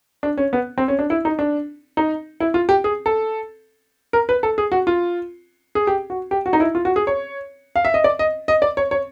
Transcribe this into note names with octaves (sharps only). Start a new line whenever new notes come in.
D4
C#4
B3
C4
C#4
D4
E4
D#4
D4
D#4
E4
F4
G4
G#4
A4
A#4
B4
A4
G#4
F#4
F4
G#4
G4
F#4
G4
F#4
D#4
E4
F4
F#4
G#4
C#5
F5
E5
D#5
D5
D#5
D#5
D5
C#5
C#5